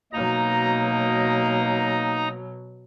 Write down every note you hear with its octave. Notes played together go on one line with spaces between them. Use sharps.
B2 F#3 A#3 D#4 A#5